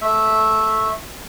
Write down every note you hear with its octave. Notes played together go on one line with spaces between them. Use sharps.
A3 E5